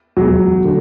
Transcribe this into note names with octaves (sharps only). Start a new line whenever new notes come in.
E2 B2 F#3 G#3
D3 A3